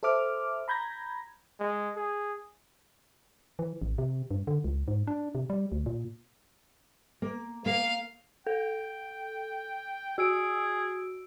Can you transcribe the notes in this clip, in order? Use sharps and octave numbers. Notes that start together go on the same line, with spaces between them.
A4 C5 E5 D6 F6
A#5 B5 G6 G#6 A#6
G#3
G#4
E3
A1
C3
G2
D3
C#2
G#2
D4
C3
G3
D2
A#2
A#3
A#3 F5
A4 G5
F#4 G#4 E6 D7